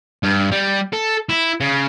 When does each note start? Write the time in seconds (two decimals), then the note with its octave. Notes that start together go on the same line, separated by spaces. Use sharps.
0.23 G2
0.51 G3
0.93 A4
1.29 E4
1.61 C#3